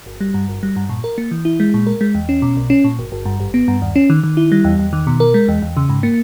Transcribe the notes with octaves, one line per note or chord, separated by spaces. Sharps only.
G1
G3
G2
G1
G3
G2
A#2
A#4
A#3
E3
E4
G#3
A#2
A#4
G#3
E2
C#4
B2
B1
C#4
A#2
G1
G1
G2
G#1
B3
G2
D#2
C#4
D#3
D#3
E4
G3
E2
E2
D#3
B2
A#4
G#3
E2
E2
C#3
G#2
A#3